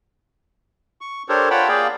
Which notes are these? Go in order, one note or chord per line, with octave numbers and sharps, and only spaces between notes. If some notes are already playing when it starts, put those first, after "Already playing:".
C#6
D4 G4 A4 A#4 C5 C#5
F4 C#5 F#5 G5 A5 B5
A#3 G#4 D5 F5 G5